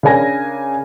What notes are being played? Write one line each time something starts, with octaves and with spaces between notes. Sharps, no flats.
C#3 D4 A#4 G#5 A#6